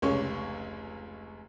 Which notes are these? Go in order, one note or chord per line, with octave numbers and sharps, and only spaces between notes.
F1 C#2 C#4 C#6